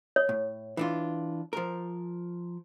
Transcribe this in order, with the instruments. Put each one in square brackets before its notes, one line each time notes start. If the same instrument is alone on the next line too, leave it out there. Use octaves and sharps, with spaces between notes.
[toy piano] C#5
[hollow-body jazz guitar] A2
E3 D4 F4
F3 A#4